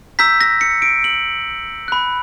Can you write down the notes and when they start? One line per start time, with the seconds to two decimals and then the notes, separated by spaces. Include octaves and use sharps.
0.19 A#5 E6 G6 B6
0.41 A#6
0.61 C#7
0.82 D7
1.04 F#7
1.88 B5 F#6